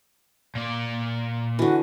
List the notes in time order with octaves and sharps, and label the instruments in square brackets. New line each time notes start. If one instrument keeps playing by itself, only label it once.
[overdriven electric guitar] A#2 D5
[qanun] D3 E3 [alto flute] F#4